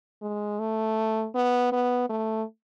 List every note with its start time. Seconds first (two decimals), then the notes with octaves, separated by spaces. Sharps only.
0.22 G#3
0.59 A3
1.35 B3
1.72 B3
2.10 A3